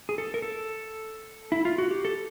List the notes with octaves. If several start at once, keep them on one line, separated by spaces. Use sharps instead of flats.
G#4
A4
A#4
A4
E4
F4
F#4
G4
A4